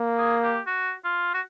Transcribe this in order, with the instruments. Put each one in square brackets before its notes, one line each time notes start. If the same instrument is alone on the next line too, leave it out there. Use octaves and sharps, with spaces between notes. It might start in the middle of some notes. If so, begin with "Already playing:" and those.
Already playing: [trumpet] A#3
[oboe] G#4
G4
F#4
F4
F#4